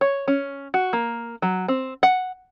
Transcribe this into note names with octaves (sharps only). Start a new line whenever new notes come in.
C#5
C#4
F#4
A#3
F#3
C4
F#5